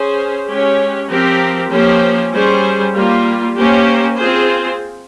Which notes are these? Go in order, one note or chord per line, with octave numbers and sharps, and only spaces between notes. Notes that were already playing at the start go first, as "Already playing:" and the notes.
Already playing: C#4 G#4 C5
G#3 C#4 G4 C#5
F3 C4 G4 A#4
F3 A#3 C#4 G4 C5
G3 C#4 G#4 C5
G3 A#3 F4
A#3 C#4 G4 C5
C4 F4 G#4 C5